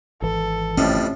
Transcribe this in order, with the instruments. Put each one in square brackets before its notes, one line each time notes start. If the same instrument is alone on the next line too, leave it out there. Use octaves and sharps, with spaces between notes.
[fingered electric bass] G#1 E3 [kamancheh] A4
[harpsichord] F2 A2 G3 [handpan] C#4